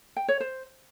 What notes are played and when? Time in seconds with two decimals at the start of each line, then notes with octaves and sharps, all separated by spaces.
0.16 G5
0.28 C#5
0.40 C5